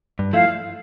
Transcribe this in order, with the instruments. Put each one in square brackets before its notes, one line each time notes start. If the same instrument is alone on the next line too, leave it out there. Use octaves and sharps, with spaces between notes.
[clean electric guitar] G2
[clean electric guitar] F3 A3 E4 [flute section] F5